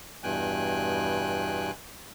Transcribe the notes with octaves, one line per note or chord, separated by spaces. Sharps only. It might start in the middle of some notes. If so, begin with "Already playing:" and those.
E2 G2 B2 G5 G#5 F#6